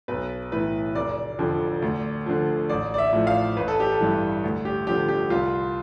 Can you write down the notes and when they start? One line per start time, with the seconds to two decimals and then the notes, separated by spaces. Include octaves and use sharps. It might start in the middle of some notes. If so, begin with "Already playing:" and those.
0.08 B1 B4
0.52 A2 E3 B4
0.95 F1 D5
1.38 F2 D3 F3
1.82 D2
2.26 D3 F3
2.69 A1 D5
2.94 D5
2.98 E5
3.13 A2 F3
3.27 F5
3.57 A1 B4
3.68 A4
3.80 G4
3.92 A4
4.00 G2 E3
4.44 D2
4.65 G4
4.87 D3 F3 G4
5.09 G4
5.30 C2 F4